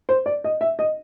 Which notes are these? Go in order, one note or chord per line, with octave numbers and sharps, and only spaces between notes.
C5
D5
D#5
E5
D#5